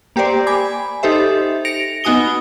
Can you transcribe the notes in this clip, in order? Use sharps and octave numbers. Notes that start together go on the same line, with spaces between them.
A#3 G4 A#4 C5 D5
G#5 B5 D6
D#4 G4 A4 C5 E5
A#6 C#7 D7 F7
B3 D#4 F#4 G#5 D#6 G7